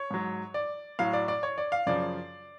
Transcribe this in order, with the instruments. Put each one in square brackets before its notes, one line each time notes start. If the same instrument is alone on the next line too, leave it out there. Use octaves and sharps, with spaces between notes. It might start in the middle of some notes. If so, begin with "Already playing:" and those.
Already playing: [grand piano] C#5
G#2 F#3
D5
A2 F#3 F5
D5
D5
C#5
D5
F5
F#2 C#3 F3 D5